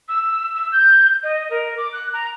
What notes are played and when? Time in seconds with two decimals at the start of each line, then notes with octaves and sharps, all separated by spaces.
0.09 E6
0.55 E6
0.72 G6
1.23 D#5
1.51 A#4
1.77 D6
1.93 F#6
2.13 A#5